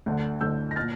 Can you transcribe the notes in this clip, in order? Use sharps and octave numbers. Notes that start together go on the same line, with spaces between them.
D2 D3
D2 D3 E6 G6
A#6
A#2 F6 A6